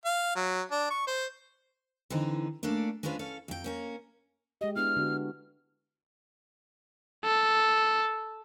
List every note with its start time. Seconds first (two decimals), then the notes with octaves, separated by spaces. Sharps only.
0.05 F5
0.36 F#3
0.71 D4
0.90 C#6
1.07 C5
2.10 D3 E3 C4 D#4
2.63 A3 A#3 C#4 D4 D5
3.03 G#3 C#4 D4 F4 B4 C5
3.19 C#4 A4 F5
3.48 F2 G5
3.64 A#3 C#4 A#4
4.61 G#3 G4 D#5
4.76 B3 D4 E4 F6
4.97 D3 B3 F#4
7.24 A4